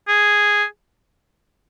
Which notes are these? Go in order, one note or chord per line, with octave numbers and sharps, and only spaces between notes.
G#4